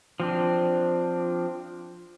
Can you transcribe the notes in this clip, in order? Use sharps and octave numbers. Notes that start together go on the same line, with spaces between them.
F3 C4 D4